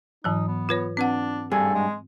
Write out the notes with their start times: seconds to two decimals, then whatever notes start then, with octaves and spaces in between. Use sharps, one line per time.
0.24 G#2 E3 F#3 D#4
0.48 B3
0.69 F4 B4 C#5
0.97 C4 D4 B4 F#5
1.51 G2 G#4 A4
1.75 G#3